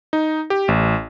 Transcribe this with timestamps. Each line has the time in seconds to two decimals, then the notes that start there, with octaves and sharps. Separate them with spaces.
0.13 D#4
0.50 G4
0.68 A1